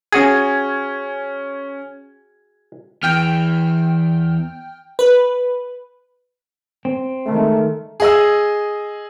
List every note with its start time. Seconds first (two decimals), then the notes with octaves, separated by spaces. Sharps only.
0.12 C#4 F#4 G#4 G#6
3.03 E2 E3 G5 F6
4.99 B4
6.85 C4
7.26 D#3 G#3 A3
8.00 G#4 D#5 E6